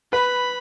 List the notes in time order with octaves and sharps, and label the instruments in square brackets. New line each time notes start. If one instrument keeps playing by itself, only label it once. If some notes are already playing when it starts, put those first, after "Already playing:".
[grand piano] B4 [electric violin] B5